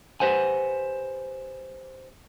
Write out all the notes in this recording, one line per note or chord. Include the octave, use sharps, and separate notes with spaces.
G4 B4 C5 F#5 G#5